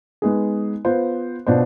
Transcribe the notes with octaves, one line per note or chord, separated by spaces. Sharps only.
G#3 B3 D#4 G#4
B3 F4 C5
B2 B3 D4 F4 C5